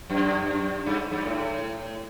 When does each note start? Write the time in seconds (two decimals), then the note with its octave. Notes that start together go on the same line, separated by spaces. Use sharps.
0.10 F#2
0.86 G2
1.12 G2
1.26 A2